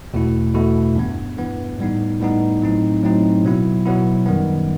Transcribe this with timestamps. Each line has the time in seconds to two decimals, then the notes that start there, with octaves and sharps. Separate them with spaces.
0.14 E2 B2 A3 E4
0.54 E2 B2 A3 E4
0.95 G2 E3 B3
1.37 G2 E3 B3
1.78 A2 G3 B3 D#4
2.20 A2 G3 B3 D#4
2.62 A2 F#3 C4 D#4
3.03 A2 F#3 C4 D#4
3.43 B2 F#3 B3 E4
3.85 B2 F#3 B3 E4
4.26 F#2 D#3 G3 B3